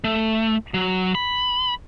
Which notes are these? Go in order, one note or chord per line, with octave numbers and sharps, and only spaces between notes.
A3
F#3
B5